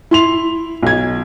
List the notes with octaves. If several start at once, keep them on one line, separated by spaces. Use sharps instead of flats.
E4 C6 F7
B1 G#6